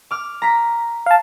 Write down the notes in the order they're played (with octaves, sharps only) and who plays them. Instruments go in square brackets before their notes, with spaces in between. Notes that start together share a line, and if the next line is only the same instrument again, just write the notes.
[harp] D6 F6
A#5 B6
[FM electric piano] F5 A5